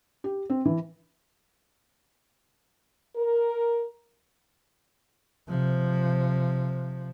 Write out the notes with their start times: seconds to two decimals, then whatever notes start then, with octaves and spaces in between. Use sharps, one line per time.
0.24 G4
0.50 C4
0.65 E3
3.16 A#4
5.48 C3 F3